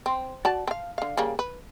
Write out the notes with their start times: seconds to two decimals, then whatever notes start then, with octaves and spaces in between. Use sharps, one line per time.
0.06 C4
0.45 F#4 D5 A5
0.67 C4 F5
0.98 D3 F5
1.17 C#3 G3 A#3
1.39 B4